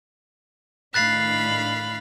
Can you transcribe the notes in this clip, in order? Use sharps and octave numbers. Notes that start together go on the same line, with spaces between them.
A2 D#3 D4 F5 B5 F#6 A6 C7